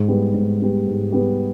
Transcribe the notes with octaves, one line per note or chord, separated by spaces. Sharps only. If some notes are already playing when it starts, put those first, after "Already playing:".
Already playing: G#2
G3 B3 G4
G#2
G3 B3 G4
G#2
G3 B3 G4